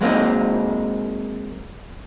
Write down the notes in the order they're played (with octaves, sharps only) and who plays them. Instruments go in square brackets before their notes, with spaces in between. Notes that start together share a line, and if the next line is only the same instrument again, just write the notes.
[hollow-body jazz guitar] F#3 G#3 A#3 C4 D#4